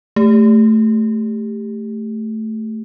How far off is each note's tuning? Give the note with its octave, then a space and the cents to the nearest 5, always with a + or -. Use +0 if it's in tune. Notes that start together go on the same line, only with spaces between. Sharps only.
A3 +0 G4 +15